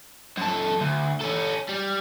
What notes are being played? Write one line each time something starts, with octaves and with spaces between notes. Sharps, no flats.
F#2 A4
D2
C#4 A4
G3